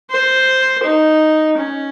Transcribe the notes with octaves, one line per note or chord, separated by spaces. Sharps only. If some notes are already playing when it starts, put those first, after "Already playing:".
C5
D#4
C#4